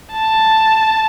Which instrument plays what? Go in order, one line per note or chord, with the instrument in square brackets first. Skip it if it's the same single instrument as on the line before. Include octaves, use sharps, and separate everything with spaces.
[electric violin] A5